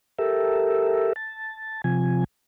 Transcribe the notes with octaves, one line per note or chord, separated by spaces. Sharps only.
G4 A4 A#4 E5
A5
C3 F3 G#5